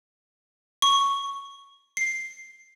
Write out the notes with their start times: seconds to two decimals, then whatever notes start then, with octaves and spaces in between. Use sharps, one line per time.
0.82 C#6
1.97 C7